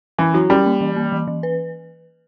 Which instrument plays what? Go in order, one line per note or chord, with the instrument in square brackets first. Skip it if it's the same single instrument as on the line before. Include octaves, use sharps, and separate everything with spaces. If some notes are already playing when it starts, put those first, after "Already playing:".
[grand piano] E3 [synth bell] C#4
[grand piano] F#3 [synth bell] E4
[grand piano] G3 [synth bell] C#4
[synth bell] A#3
E3
A#3
E3
E3
B4